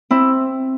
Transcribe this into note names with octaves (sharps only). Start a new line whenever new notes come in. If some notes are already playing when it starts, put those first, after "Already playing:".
C4 E4